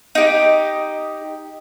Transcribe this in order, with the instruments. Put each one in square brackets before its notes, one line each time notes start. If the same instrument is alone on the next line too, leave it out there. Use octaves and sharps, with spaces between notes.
[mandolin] D#4 G4